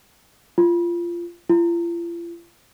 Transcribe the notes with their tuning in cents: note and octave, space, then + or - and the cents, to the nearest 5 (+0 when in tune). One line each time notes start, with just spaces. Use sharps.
F4 -20
F4 -45